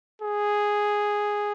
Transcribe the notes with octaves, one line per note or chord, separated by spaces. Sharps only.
G#4